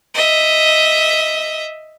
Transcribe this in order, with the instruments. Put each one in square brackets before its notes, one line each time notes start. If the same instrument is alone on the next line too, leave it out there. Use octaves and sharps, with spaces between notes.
[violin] D#5 E5